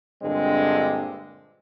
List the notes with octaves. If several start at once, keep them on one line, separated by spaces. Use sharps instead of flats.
G2 A#2 D3 G#3 C4